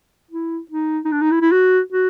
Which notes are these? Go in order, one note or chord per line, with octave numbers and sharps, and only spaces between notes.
E4
D#4
D#4
D4
D#4
E4
E4
F#4
F#4